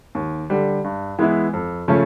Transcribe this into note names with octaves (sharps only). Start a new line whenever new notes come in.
D#2
D3 G3
G2
E3 G#3 B3 E4
F2
C#3 F3 A3 C#4